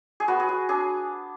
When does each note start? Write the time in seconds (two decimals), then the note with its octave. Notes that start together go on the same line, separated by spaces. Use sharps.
0.20 G#4
0.28 B3 F#4
0.40 G#4
0.49 F#4
0.69 D4 G#4